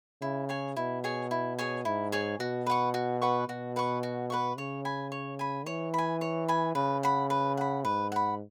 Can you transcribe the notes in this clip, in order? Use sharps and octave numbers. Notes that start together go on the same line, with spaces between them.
C#3 E4
G#4 C#5 G#5
B2 E4
G#4 C#5 G#5
E4
G#4 C#5 G#5
G#2 E4
G#4 C#5 G#5
B2 F#4
B4 F#5 C#6
F#4
B4 F#5 C#6
B2 F#4
B4 F#5 C#6
F#4
B4 F#5 C#6
C#3 C#5
G#5 B5
C#5
G#5 B5
E3 C#5
G#5 B5
C#5
G#5 B5
C#3 B4
F#5 B5
B4
F#5 B5
G#2 B4
F#5 B5